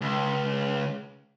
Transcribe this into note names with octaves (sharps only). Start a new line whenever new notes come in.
C#2